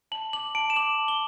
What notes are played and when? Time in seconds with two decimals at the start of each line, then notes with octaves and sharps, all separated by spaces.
0.12 A5 F#7
0.33 D6 F#7
0.55 A5 D7
0.70 E7
0.76 D6 F#7
0.98 A5
1.08 G7